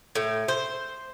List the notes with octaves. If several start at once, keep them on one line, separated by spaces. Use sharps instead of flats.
A2
C5